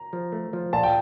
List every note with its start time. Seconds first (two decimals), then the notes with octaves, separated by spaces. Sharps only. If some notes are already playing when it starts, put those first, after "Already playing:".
Already playing: A#5
0.13 F3
0.32 A3
0.53 F3
0.73 A#2 A5
0.83 G5